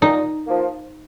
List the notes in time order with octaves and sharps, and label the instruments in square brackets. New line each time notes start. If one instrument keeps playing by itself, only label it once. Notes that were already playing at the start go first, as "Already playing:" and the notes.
[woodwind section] A#2 [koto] D#4
[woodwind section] F3 A#3